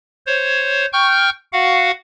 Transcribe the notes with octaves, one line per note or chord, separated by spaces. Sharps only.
C5 C#5
G5 C#6 F6 G6
F#4 F5 F#5